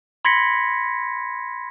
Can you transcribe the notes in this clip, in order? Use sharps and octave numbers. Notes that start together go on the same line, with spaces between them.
B5 C6 G#6 A#6 B6 C#7